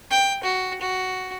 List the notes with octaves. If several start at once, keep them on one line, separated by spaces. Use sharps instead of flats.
G5
F#4
F#4